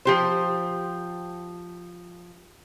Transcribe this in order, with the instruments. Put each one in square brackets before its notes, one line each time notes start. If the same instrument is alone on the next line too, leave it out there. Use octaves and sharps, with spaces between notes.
[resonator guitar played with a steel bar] F3 G4 C5